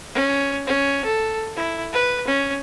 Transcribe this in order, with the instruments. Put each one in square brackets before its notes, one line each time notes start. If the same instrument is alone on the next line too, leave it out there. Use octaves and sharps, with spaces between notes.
[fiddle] C#4
C#4
A4
E4
B4
C#4